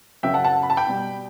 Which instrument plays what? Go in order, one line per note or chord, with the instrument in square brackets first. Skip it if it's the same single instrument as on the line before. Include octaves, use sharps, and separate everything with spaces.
[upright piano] F#2 C#3 F#3 E5 G5
F#5 A5
F#5 A5
B5
A5
G5 B5
B2 G3